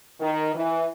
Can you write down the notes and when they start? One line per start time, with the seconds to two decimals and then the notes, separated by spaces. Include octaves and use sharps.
0.20 D#3
0.54 E3